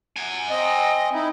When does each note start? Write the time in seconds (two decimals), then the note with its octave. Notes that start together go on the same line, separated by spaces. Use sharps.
0.16 F#5 G#5
0.50 C4 D#5
1.13 D#4 E4